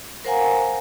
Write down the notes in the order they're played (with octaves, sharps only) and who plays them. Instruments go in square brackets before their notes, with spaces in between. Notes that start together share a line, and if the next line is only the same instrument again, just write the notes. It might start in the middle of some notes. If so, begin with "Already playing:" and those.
[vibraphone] A#4 C5 F5 F#5 G#5 A#5